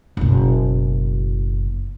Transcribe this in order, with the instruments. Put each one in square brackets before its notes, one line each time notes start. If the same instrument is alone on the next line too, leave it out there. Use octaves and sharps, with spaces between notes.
[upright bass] F#1 B2